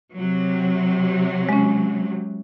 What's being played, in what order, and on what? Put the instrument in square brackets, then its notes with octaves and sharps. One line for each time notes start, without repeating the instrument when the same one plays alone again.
[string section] C3 F#3
[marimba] G#3 C#4